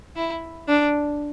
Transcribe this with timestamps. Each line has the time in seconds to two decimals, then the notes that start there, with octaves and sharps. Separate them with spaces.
0.16 E4
0.68 D4